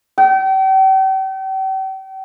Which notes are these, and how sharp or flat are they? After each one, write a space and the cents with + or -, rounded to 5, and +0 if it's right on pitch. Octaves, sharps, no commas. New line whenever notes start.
G5 -40